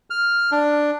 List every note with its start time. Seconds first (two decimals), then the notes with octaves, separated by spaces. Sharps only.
0.10 F6
0.52 D4